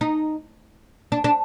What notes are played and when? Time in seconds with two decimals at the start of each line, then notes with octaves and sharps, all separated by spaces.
0.01 D#4
1.12 D4
1.24 D4